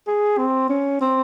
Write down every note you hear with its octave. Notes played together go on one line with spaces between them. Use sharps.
G#4
C4
C#4
C4